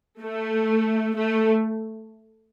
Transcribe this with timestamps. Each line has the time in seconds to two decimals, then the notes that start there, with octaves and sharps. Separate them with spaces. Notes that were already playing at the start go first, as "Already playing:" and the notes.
0.21 A3
1.16 A3